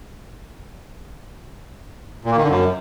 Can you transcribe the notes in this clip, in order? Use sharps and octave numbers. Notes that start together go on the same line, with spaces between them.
A#2
A#3
D#3
D3
F#2